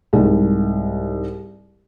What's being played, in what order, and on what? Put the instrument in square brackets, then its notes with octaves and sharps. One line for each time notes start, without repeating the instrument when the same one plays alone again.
[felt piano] C2 G#2